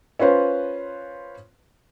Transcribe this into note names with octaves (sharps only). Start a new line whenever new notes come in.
C#4 F4 B4 C5